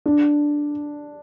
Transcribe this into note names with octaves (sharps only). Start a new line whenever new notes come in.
D4